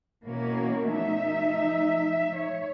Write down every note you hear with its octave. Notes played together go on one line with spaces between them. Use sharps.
B2 E3 A#3 C#4 F#4 C#5
F3 A3 D#4 E5
C#5